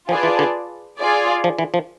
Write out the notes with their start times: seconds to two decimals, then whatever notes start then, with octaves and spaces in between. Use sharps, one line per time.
0.09 F3 F4 G#4 B4 D5 A5
0.23 E3
0.39 D3
0.98 F4 G#4 D5
1.44 F3
1.59 E3
1.74 F3